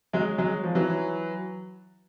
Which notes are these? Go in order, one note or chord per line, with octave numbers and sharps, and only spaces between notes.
F#3 G#3
F#3 G#3
F3
E3 F#3